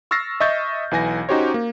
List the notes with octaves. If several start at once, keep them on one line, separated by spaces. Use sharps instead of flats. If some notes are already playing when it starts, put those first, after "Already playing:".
C#6 E6 F6 A6 A#6 C7
D#5 E5 C#6 G6 A6
B1 E3 G#5 A#6
C#4 D#4 F#4 G4 C5 C#5
A#3